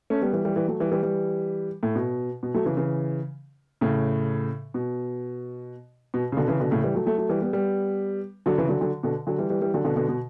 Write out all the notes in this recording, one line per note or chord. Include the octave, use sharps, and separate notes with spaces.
A3 C#4
G3 B3
E3 G3
E3 G3
E3 G3
F#3 A3
E3 G3
E3 G3
E3 G3
A2
B2
B2
F#3 A3
C#3 E3
C#3 E3
A2 C#3
B2
B2
C#3
B2 D3
C#3 E3
B2 D3
A2 C#3
E3 G3
F#3 A3
F#3 A3
F#3 A3
E3 G3
G3 B3
G3 B3
D3 F#3
C#3 E3
D3 F#3
D3 F#3
B2 D3
D3 F#3
E3 G3
E3 G3
E3 G3
D3 F#3
B2 D3
B2 D3
B2